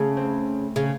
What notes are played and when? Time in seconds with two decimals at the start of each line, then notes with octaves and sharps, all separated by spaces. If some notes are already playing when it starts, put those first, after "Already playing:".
Already playing: C#3 A3
0.17 C4
0.76 C#3